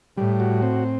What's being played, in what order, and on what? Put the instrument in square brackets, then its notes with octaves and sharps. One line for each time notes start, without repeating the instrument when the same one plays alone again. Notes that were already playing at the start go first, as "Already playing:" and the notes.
[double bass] A2 [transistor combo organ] G3
[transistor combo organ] F#4
C4